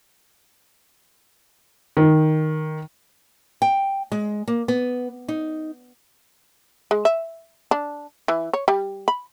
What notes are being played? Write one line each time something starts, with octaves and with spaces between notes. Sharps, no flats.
D#3
G5
G#3
A#3
B3
D#4
G#3
E5
D4
E3
C#5
G3
B5